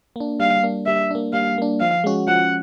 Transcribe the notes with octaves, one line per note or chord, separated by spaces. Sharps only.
A#3 D4
G3 F5
A#3 D4
G3 E5
A#3 D4
G3 F5
A#3 D4
F3 F5
G#3 C#4 F#4
F3 F#5